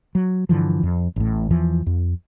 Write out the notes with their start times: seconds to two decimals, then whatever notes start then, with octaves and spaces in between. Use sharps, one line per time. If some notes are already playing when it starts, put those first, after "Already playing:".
0.15 F#3
0.49 G2 D3 E3 F3
0.83 F2
1.16 A1 A2
1.50 E2 E3 F3
1.86 F2